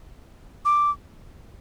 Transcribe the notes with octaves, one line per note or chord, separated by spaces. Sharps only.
D6